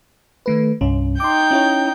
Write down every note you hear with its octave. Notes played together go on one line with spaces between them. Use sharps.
D#3 A3 B4
C2 G2 C#4
D#4 G5 C6 D6 G6
C#4 E4 C#5